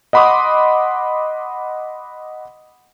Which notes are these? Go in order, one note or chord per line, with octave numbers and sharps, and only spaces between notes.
D#5 F#5 B5 C6 D6 D#6